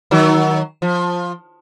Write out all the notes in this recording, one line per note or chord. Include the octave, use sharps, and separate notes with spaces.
D#3 F#3
F3